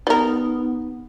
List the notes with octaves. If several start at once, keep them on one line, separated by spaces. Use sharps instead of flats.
G3 B3 D#4 A#4